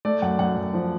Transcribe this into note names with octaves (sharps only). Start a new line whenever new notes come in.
A3 D5
F#2 F#5
F#2 F#5
F#2
F3